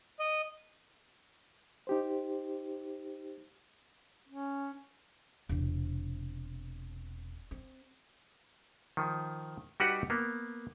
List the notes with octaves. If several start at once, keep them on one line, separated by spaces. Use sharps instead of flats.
D#5
D#4 G4 C5
C#4
E1 C3
C4
D#3 F3
G3 D#4 F#4 G4 B4 F#5
A#3 B3